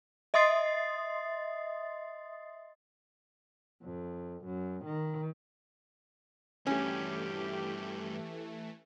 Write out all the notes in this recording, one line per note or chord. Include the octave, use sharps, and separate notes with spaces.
D#5 E5 C6 D#6 A6 C7
F2
F#2
D#3
G2 E3 A3 C#4 F#4 G4